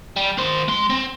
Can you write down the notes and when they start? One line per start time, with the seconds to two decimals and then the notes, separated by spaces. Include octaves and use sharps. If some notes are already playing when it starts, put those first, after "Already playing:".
0.16 G3
0.38 D#3 C5
0.68 G#3 C6
0.90 C4